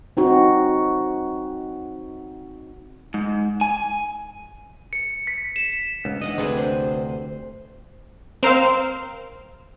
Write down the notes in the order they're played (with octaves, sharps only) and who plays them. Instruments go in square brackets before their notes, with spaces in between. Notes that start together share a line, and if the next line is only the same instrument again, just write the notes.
[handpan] C4 D#4 F#4
[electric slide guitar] G#2
G#5
[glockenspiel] C#7
B6
E7
[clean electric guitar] C#2 G#2
[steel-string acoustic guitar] E3 B3 D4 [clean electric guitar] D#5
[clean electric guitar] D2 C3 [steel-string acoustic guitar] D4 G#4 B4
[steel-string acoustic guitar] C5
[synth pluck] C4 A#4 C5 F5